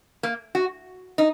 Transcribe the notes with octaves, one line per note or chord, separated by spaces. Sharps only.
A#3
F#4
D#4